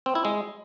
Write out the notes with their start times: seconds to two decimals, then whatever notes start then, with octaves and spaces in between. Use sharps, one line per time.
0.06 C4
0.15 E4
0.25 G#3